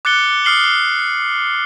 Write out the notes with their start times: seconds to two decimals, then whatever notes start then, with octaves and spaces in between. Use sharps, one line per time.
0.05 D6 F#6 A6 C#7 G7
0.45 D6 D#6 F6 C7 F#7 G7